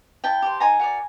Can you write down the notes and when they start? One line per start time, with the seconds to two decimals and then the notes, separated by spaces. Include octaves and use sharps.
0.24 E4 G5 A5
0.42 G4 C5
0.60 D#4 G#5 A#5
0.80 F#4 A#4 D5